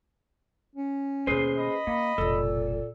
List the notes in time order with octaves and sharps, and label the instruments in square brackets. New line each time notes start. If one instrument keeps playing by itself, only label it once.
[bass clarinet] C#4
[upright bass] D#2 B2 [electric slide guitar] G#4 B4 C5
[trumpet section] D#5 B5
[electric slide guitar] A#3 [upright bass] C#4
[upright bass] F1 B1 [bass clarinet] A#2 [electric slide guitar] A4